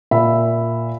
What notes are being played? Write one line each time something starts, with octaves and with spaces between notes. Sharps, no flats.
A#2 E5 B5